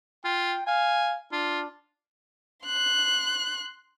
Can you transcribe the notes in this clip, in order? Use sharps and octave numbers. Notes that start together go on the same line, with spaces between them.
F4 G5
F5 G#5
D4 F4
C6 F#6